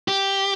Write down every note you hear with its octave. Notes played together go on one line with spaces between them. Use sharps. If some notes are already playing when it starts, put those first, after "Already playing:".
G4